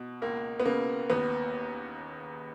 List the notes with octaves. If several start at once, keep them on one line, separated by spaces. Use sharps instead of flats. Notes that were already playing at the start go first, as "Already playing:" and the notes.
Already playing: B2
C#2 A#3
B3
C#3 A#3
D#2 B3